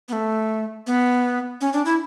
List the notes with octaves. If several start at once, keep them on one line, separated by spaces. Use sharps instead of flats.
B3
A3
B3
C#4
D4
E4